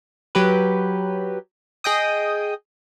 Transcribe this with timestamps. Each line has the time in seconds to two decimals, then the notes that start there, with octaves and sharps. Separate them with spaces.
0.35 F#3 G4 B4
1.84 G#4 D#5 G5 D#6